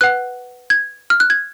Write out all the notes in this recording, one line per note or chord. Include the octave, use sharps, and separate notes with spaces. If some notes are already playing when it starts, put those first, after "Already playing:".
B4 F#5 F#6
G#6
F6
F#6
G#6